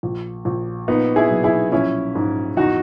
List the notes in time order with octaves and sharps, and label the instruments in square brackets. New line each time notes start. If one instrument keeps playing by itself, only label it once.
[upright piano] A#1
A#1
A#2 B3 D#4
E4 G#4
B1
E4 G#4
A#1 C#4 E4
G#2
E2 D#4 F#4